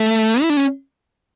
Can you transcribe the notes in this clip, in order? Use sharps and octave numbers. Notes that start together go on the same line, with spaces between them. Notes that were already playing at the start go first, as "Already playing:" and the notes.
Already playing: A3
E4
D4
C#4